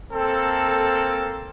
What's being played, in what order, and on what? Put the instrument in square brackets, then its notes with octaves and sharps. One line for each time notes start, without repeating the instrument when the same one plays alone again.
[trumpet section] A#3 C4 A4